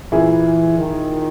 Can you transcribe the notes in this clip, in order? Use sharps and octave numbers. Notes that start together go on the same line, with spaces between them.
A#2 E3 A#3 E4 G#4
D#3